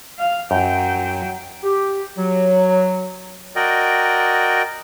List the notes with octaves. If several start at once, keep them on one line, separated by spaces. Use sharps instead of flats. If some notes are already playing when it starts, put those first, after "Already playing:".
F5
F#2 F#3 G5
G4
F#3
F#4 A#4 D5 D#5 G5